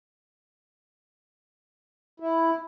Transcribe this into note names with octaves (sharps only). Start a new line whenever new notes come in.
E4